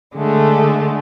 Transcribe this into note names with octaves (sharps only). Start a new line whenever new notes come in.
D3 G#3 A3